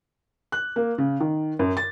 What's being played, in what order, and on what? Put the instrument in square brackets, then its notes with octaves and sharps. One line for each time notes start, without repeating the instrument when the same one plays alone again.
[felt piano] F#6
A#3
C#3
D#3
F#2
A6